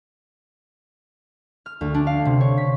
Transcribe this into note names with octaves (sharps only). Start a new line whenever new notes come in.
F6
D2
D4
F5
C3
C#5
B6